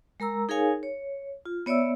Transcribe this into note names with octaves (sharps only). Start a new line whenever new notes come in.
G#3 A#4 A#5 E6
D#4 G#4 A#4 C#5 F5 G#5
C#5
F4
B3 C#5 D5 E5 E6